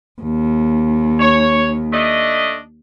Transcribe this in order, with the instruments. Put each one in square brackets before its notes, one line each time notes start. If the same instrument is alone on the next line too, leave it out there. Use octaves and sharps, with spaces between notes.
[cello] D#2
[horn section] C#5
A3 D4 D#5